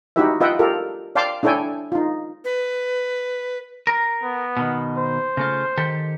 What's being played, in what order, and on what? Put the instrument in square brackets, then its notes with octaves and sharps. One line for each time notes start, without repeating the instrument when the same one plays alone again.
[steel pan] D#4 E4 F#4 G4 B4 E5
F4 B4 D#5 E5 F#5 G5
F4 G4 A4 A#4
D5 F5 G5 A5 C6 D6
D4 E4 A4 C#5 G5 G#5
D#4 F4
[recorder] B4
[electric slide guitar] A#4
[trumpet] B3
[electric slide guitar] B2 D#3
[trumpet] C5
[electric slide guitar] C#3 A3 F4
D#3 G4 A4